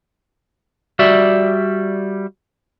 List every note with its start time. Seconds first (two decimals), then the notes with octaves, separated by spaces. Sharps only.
0.99 G3 F#4 D5 E5